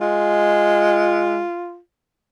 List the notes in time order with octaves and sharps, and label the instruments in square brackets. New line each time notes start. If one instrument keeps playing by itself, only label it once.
[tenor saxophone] G#3 [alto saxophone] F4